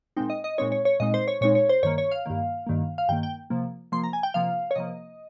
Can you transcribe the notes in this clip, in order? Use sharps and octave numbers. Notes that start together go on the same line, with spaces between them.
A#2 G#3 C4 D#4 G5
D#5
D#5
A#2 G#3 C4 D#4 C#5
C#5
C#5
A#2 G#3 C4 D#4 D#5
C5
C#5
A#2 G#3 C4 D#4 C#5
C#5
C5
G2 D#3 A#3 C#5
C#5
F5
G2 D#3 A#3
G2 D#3 A#3
F5
G2 D#3 A#3 G5
G5
C3 F3 A#3
C3 F3 A#3 C6
A#5
G#5
G5
C3 F3 A#3 F5
C#5
C3 F3 A#3 D#5